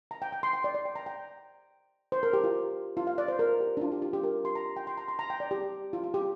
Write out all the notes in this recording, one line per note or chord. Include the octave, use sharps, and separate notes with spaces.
A#5
G5
G5
C6
G5
D5
D5
G5
A#5
G5
C5
A#4
G4
F4
F4
F5
D5
C5
A#4
G4
D4
F4
G4
F4
G4
A#4
C6
A#5
G5
C6
A#5
C6
A#5
G5
D5
G4
F4
F4
G4